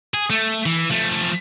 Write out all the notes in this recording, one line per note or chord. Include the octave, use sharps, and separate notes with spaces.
G#4
A3
E3
F3 A3